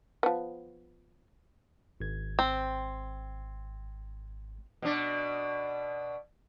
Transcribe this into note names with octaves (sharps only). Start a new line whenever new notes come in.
F3 B3
G#1 G#6
C4
B2 D4